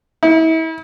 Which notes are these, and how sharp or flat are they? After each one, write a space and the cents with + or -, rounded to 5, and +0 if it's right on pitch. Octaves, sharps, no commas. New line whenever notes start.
E4 -35